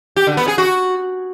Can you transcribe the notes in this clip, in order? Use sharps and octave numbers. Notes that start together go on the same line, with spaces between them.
G4
D3
B3
G#4
F#4